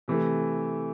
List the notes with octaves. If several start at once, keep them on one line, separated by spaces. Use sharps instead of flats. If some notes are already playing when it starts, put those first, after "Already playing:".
C3 E3 A3